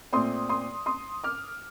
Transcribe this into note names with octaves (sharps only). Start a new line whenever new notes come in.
A#2 A3 C4 C6 D#6
C6 D#6
C6 D#6
D6 F6